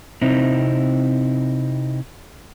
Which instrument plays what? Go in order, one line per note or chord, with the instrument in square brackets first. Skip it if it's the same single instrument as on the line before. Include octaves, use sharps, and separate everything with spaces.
[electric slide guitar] C3 C4 D#4 E4